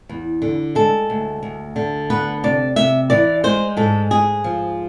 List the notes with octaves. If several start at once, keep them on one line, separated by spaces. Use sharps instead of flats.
E2
D3
G#3 A4
D2
D2
D3
B3 B4
C3 D5
C3 E5
E3 D5
G#3 C5
G#2 A4
G#2 G#4
F3